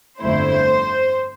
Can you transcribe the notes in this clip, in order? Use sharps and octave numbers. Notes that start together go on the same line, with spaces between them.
G1 F2 D3 A3 E4 C5